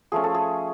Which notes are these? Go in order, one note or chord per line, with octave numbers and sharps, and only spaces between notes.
F3 A3 C#4 G#4
A4
G#4